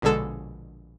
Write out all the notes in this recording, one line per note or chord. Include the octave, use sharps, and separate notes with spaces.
A#1 B2 D3 G#3 A4 E7